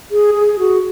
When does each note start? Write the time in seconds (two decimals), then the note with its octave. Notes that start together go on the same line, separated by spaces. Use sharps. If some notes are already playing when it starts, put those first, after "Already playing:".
0.11 G#4
0.35 G#4
0.59 F#4